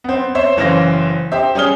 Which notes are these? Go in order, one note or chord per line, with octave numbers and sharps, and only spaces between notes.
B3 C4
C5 C#5 E5
F#1 E3 C#4 C5 F5 A#6
G4 C5 E5
G3 C#4 G#4 D#6 F6 G7